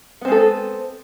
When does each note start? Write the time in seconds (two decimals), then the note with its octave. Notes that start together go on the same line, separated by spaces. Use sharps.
0.21 B3
0.25 C4
0.28 G#3
0.32 A4